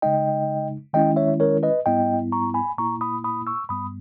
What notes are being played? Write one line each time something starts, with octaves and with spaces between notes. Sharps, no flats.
C#3 G#3 D#4 D#5 G5
D#3 G#3 C#4 E4 D#5 G5
C#5 E5
A#4 C#5
B4 D#5
G#2 G3 B3 E4 D#5 G5
A#5 C#6
G#5 B5
A#2 A#3 E4 A#5 C#6
B5 D#6
B5 D#6
C#6 E6
G2 G3 B3 B5 D#6